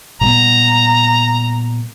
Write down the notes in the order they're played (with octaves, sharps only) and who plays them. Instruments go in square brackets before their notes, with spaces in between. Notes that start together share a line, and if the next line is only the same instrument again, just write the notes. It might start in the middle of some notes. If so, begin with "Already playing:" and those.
[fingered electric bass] A#2 G3 B3 [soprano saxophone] A#5